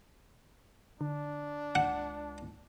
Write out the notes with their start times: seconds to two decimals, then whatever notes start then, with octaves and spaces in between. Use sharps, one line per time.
1.01 D3 D4
1.75 C#2 F#5